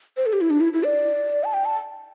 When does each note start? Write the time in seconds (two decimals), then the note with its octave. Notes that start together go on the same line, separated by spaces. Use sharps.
0.17 C5
0.26 A4
0.33 G4
0.41 E4
0.50 D4
0.61 E4
0.73 E4
0.85 D5
1.44 A5
1.54 G5
1.65 A5